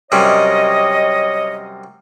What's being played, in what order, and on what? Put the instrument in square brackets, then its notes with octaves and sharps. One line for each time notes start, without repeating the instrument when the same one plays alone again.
[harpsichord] F#2 C3 G3 [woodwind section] C#5 D#5